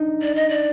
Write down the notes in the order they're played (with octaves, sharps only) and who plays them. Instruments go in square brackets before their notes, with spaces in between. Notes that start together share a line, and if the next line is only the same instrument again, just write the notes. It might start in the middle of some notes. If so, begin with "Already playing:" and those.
Already playing: [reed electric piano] D4 D#4
[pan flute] D5
D#5
D5